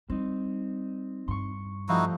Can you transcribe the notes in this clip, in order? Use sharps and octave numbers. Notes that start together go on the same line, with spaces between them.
G3 C4 D#4
G2 C6 C#6
F3 G3 A3 D#4 E4 F#4